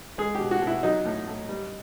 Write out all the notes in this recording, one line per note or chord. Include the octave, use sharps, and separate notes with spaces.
G#3 G#4
G4
B2
F#4
B2
E4
F#3 D#4
A2
A2
G3